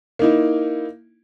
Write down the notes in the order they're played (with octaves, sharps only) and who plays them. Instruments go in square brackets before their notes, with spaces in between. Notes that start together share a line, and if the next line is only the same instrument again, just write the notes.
[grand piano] A#3 D#4 E4